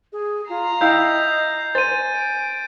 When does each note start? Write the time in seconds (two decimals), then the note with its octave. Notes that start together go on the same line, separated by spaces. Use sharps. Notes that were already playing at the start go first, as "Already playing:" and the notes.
0.13 G#4
0.49 F4 A#5 C7
0.81 E4 D#5 F5 G5 G6
1.75 C5 G#5 A6 D#7
2.16 D7